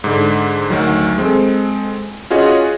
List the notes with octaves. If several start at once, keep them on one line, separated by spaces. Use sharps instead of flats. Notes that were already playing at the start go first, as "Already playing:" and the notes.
G#2 D3
D2 D#3 F#3
G#3 C4 A4
C#4 F4 F#4 G#4 C#5 D#5